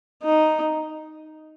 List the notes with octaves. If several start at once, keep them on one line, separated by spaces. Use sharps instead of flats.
D#4